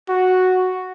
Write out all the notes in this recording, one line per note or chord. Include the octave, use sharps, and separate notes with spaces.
F#4